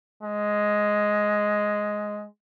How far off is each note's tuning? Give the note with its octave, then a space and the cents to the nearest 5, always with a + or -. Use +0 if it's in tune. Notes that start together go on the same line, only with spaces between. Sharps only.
G#3 +5